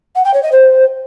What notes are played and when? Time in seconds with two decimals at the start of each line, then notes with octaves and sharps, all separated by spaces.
0.15 F#5
0.25 G5
0.34 C#5
0.43 D#5
0.52 C5